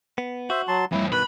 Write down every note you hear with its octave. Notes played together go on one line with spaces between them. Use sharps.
B3
F#4 C5 E5
F#3 A5 C6
F2 E3 G3 E4
G2 B2 D#3 B4 B5